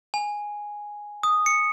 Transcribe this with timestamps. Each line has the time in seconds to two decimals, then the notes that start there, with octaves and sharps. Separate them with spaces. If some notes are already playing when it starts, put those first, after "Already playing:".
0.14 G#5
1.23 D#6
1.46 C#7